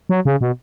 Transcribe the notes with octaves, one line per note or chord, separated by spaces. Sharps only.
F#3
C#3
B2